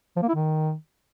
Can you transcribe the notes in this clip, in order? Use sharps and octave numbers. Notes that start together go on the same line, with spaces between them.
F3
A#3
E4
D#3